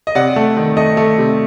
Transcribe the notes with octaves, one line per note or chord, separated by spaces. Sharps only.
D#5
C3 D5 F#5
A3
D#3
A3 D#5
A3
C3